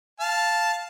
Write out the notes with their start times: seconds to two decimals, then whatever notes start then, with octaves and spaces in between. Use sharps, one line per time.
0.20 F5 A5